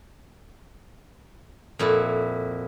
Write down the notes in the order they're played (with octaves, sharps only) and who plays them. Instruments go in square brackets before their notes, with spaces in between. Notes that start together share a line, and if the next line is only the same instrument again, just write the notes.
[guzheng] F2 A#2 E4 F#4